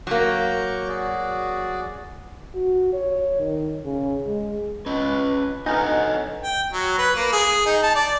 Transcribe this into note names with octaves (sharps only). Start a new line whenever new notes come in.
F#3 A#3 C#6 D6 G6
F#4 G#4 D5
F#4
C#5
D#3
C#3
G#3
C#4 B4 D#5
D4 D#4 A4 B4 C#5 D#5 F#5
G5
F#3
B4
A#3
G#4
D#4
A5
D5